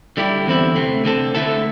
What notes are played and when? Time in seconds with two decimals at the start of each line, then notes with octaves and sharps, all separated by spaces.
0.17 D3 G3 E4 G4
0.46 E2 D3 C4 E4
0.75 C3 A3 C4
1.05 D3 C4 A4
1.35 D3 A3 E4 A4